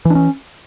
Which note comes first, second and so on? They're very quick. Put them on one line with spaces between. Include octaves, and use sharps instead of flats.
E3 D4 C#4